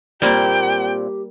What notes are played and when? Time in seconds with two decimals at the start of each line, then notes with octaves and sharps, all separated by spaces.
0.22 A#2 G3 A#3 C4 G4 G5